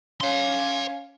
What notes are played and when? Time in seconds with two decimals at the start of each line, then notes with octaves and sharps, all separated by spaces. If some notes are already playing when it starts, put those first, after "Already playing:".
0.21 C#4 C#5 F5 C6